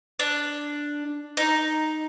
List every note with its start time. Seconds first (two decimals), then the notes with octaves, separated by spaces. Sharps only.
0.19 D4
1.37 D#4